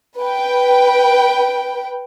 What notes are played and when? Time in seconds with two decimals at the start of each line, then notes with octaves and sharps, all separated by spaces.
0.18 B4 G5